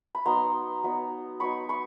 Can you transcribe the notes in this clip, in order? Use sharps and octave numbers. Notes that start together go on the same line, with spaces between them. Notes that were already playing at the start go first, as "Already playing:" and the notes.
B5
F#3 B3 D#4 A#5 C6
F#3 B3 D#4
F#3 B3 D#4 B5 C#6
B5 C#6